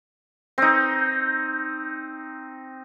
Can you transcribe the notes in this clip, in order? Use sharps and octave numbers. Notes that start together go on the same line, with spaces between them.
C4 D#4